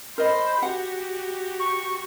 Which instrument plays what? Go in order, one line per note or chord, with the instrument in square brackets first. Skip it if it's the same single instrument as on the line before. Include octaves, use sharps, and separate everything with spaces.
[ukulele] A#4 D#5 [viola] C5 B5
[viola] F#4 G4 [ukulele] F#5
[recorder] C#6